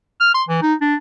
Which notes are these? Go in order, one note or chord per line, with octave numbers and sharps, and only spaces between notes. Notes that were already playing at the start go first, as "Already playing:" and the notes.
F6
C6
E3
D#4
D4